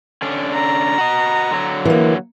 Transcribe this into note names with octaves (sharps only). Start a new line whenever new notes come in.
D3 C#4 D4
A#5
F#4 D#5
D3 F#3
E3 A#3